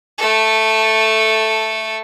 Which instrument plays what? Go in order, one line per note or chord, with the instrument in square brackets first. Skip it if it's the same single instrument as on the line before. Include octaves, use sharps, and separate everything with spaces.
[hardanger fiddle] A3 A4